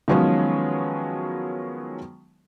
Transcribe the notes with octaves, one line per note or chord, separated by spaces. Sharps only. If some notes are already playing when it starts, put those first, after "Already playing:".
D#3 F3 F#3 G#3 B3 C#4